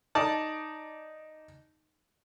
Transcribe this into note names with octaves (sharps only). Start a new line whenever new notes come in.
D#4 D5 A5